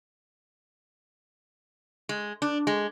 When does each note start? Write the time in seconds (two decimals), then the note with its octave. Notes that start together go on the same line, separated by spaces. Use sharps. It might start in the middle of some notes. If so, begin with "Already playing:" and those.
2.09 G#3
2.42 D4
2.67 G#3